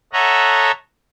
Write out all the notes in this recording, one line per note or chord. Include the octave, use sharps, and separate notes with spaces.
A4 C#5 D#5 E5 F#5 A#5